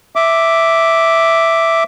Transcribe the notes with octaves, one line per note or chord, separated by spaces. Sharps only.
E5 D6